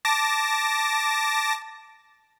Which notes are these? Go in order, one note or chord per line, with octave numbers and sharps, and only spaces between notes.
A5 D6 A#6